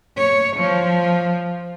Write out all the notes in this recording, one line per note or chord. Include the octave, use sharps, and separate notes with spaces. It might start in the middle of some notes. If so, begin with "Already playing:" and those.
C#5
F3